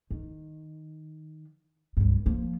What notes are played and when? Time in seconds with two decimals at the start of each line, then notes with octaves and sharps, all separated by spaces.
0.11 D#3
1.97 C#2 G2
2.26 F3 A#3